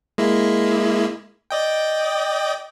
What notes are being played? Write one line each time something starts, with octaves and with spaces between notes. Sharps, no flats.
G#3 A#3 E4
D5 D#5 G5